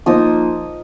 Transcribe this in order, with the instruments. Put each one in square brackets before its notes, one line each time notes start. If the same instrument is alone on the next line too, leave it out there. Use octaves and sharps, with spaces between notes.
[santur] F3 A#3 D#4 D#6